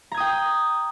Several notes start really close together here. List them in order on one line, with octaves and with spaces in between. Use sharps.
A#5 G#6 D#6 G5